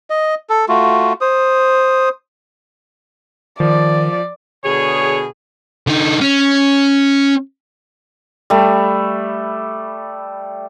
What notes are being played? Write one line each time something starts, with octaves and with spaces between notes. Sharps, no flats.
D#5
A4
A3 F4 F#4
C5 D#6
D#3 F3 D5
B2 D3 G#4 C#5
D3 D#4
C#4
G3 A3